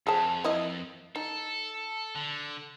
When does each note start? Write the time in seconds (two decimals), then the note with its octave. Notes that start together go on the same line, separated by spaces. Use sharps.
0.07 F2 G#4 C5 A5
0.44 A#3 E4 D#5
1.16 D#4 A4
2.15 D3